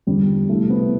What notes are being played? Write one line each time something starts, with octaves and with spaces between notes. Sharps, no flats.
E2 D3 F3 G3
C2 B2 A3
B3